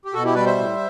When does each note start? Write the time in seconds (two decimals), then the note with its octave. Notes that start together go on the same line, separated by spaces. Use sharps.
0.05 G4
0.13 B2 F#4 A4
0.24 E4 G4
0.35 G3 B4 D5
0.46 C5 E5
0.57 A2